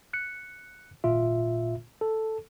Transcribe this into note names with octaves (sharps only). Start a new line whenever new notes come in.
F#6 C#7
G#1 A#2 F4 E5
A4